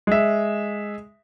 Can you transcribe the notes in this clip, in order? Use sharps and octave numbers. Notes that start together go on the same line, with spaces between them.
G#3 E5